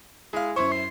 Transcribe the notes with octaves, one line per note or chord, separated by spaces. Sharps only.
G#3 E4 F5
F#2 E4 C5 C#5
C6